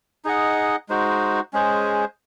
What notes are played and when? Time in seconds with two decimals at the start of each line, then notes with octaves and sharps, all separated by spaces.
0.25 D#4 G#4 D#5 F#5
0.89 G#3 D#4 F#4 C5
1.53 G#3 C#4 G#4 C5